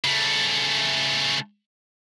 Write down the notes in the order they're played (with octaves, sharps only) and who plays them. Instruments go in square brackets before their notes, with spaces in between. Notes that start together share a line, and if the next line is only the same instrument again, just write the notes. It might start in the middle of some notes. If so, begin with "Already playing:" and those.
[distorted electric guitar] C#3 A3